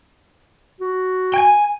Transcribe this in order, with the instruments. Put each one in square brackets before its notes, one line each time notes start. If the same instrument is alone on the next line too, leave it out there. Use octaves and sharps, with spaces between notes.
[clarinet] F#4
[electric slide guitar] G5 G#5